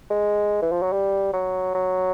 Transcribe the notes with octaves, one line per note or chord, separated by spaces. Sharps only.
G#3
E3
F3
F#3
G3
F#3
F#3